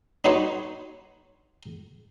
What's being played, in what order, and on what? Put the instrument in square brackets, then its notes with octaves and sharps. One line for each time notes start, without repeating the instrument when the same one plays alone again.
[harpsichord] D4 D#4 F#4 B4 C#5 C6